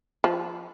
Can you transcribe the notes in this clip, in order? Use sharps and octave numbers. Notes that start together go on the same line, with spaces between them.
F3